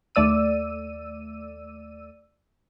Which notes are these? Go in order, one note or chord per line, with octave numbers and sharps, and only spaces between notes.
D#2 A3 D5 E6 D#7